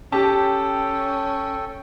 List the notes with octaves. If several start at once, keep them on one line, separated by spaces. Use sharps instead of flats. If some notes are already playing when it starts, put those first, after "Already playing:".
C#4 G4 A4 G5 A5